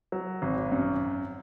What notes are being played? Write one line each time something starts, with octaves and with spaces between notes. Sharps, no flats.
F#3
G#1
F#2